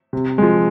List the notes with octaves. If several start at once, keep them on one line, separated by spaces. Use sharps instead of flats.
C3
F3 G#3